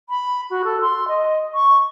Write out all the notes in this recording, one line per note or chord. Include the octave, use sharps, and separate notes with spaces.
B5
F#4
A4
C6
D#5
C#6